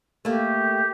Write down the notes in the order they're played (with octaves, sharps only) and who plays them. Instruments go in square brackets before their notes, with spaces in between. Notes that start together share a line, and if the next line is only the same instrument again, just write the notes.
[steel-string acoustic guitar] A3 A#3 [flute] G4